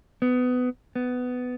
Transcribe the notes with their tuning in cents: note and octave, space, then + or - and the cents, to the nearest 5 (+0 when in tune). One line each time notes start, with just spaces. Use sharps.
B3 +20
B3 +15